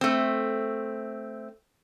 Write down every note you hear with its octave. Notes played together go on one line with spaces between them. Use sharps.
A3 C4